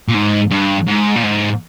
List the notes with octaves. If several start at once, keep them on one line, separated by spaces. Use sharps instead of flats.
A#2
G#2
G2
G#2
A#2
G#2